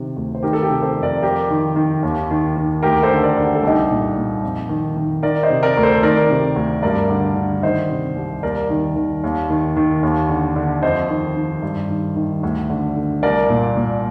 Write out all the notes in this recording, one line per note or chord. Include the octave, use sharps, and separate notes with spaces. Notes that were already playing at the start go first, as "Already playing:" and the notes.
Already playing: C3 D#3
D2
C5
D#3 G4 A#4
A4
G4 A#4
C3
A4 C5
F2
A#4 D5
F2 G4 A#4
D#3
D#3
D#2
D#3
D#3
D2 G4 A#4
A4 C5
D3
A#4 D5
D3
G4
A4
C2 D#4 G4
A#2
A#2
F2
D#3
D#3
D#3 A#4 D5
C5 D#5
C3
A#4 D5
D2
A4 C5
D#3 A#4 D5
C3
D2
G2 A#4 D5
D3
D3
D#3 C5 D#5
C3
C2
D#2 A#4 D5
D#3
D#3
D#2
D#3
D#3
D#2
D3
D3
F2 C5 D#5
D#3
D#3
G2
D#3
D#3
D2
D3
D3
C2 A#4 D5
A#2
A#2